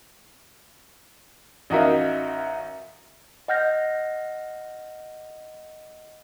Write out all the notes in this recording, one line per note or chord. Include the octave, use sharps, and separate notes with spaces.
A1 D#4 F#4 A#4 E5 F5
D#5 F#5 F6 G6 A#6